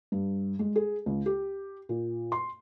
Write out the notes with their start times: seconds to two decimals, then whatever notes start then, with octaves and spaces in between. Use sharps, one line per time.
0.12 G2
0.59 G#3
0.76 G#4
1.06 C#2
1.26 G4
1.89 A#2
2.32 C6